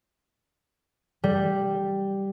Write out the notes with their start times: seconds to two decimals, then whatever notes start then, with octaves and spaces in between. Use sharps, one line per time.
1.24 G3